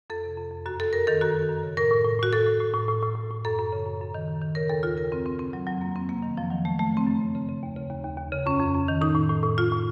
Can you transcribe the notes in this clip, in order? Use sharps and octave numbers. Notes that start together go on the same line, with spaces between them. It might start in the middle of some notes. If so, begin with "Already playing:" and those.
F2 A4
C3
F2
F2
F#2 F#4
F#2 A4
F#2 A#4
D#3 A4
F#2 F#4
F#2
F#2
C#3
A2 A#4
A2
A2
A2 F#4
A2 A4
A2
A2
A2
A2
A2
A2
A2
F#2 A4
F#2
C#3
F#2
F#2
D#3
D#3
D#3
C#3 A#4
D#2 A4
D#2 F4
C#3 A#4
F#2 C4
C#3 C4
C#3 C4
F#2 F#3
F2 F#3
F2 A#3
F2 C4
C3 A#3
D#3 F#3
F2 F3
D#3 F#3
D#3 A3
F#2 A3
C#3 C4
F#2
C#3
C#3
C#3
D#2
C#3
D#2
D#2
D#2
C#3
F2 C#4
F2
F2
D#3
A2 D#4
A2
A2
A2
A2 F4
A2